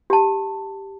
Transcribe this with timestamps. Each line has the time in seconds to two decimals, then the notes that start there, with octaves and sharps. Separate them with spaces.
0.10 G4 A5